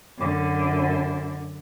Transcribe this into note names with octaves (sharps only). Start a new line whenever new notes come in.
F#2 D3